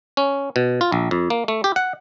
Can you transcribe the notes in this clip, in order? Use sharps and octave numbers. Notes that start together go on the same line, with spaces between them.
C#4
B2
F4
A#1
F2
A#3
A3
G4
F#5